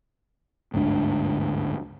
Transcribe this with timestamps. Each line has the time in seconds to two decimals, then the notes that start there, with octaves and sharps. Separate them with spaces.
0.74 G1 D2 G#2 D4